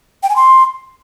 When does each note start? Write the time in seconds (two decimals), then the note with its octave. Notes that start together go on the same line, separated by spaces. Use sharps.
0.23 G5
0.29 G#5
0.36 C6